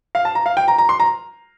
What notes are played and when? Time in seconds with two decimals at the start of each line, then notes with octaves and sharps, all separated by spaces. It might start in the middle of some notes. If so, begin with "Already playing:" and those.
0.15 F5
0.25 A5
0.35 A#5
0.46 F5
0.57 G5
0.68 A#5
0.78 A#5
0.89 C6
1.00 A#5